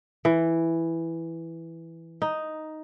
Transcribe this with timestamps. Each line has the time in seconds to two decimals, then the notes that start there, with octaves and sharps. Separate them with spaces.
0.25 E3
2.22 D#4